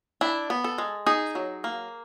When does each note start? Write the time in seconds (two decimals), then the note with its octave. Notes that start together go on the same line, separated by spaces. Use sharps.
0.21 D4 E4
0.50 B3
0.64 A4
0.78 G#3
1.06 D#4 G#4
1.35 F#3
1.64 A#3